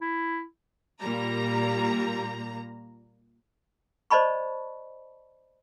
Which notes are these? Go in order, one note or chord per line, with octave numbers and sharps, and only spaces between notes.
E4
A#2 G3 A#3 A#5
C5 D5 D#5 A5 B5 C#6